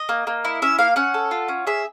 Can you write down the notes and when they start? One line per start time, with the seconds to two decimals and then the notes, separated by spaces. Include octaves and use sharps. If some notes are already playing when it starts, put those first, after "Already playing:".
Already playing: D#5
0.09 A#3
0.27 A#3
0.45 E4
0.62 C#4 E5
0.79 A#3 F5
0.96 C#4 F#5
1.14 A4
1.31 F4
1.48 C#4
1.67 G#4 E5